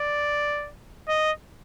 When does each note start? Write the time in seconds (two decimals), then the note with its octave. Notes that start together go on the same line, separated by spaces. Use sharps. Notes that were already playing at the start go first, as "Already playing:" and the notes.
Already playing: D5
1.09 D#5